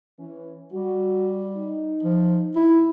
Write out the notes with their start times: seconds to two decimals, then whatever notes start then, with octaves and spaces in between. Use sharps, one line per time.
0.19 E3 C#4
0.72 G3 F#4
1.57 D#4
2.03 F3
2.56 E4